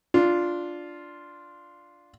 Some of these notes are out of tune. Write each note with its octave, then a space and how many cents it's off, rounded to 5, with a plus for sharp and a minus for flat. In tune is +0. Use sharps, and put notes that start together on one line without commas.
D4 +0 F4 +0